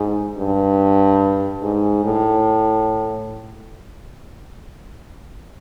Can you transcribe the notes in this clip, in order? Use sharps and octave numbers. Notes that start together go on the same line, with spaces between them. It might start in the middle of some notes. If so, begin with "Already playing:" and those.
Already playing: G#2
G2
G#2
A2